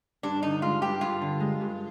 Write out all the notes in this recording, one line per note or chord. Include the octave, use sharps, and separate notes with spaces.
G2 D4
D3 D#4
G#3 F4
G2 G4
G2 F4
D3
G#3
G2